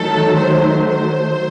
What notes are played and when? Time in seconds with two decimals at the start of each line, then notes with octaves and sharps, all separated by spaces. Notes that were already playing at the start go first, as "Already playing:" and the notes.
Already playing: D#3 F#3 A3 A4
0.36 C5
0.87 C5